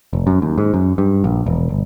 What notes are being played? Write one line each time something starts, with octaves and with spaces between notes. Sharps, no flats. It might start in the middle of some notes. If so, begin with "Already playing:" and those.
F1
F#2
D#2
G#2
F#2
G2
A#1
E1
G1